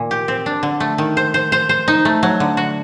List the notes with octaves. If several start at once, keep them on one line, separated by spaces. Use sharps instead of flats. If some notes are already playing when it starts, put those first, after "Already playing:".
Already playing: A#2 D#3
G4
C4
D4
D3
A3
D#3
C5
C5
C5
C5
D#4
A3
F#3
D3
F#4